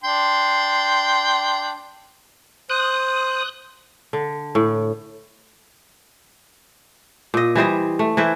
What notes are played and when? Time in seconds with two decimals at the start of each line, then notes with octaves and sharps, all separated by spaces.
0.04 D4 G5 C6
2.70 C5 D#6 F#6
4.13 D3
4.55 A2
7.34 A#2 D#5
7.55 E3 G3 C5 D#5
7.99 A3
8.17 E3 E4 B4 C5